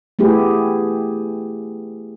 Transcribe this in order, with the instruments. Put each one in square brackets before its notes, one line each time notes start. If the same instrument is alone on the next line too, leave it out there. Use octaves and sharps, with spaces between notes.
[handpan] A3 B3 E4 G4 G#4